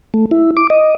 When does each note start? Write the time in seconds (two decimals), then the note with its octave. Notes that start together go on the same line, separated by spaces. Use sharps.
0.14 A3
0.31 E4
0.57 D6
0.70 D#5